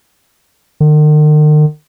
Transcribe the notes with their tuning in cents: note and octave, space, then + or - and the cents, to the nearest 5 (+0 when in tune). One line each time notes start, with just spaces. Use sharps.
D#3 -45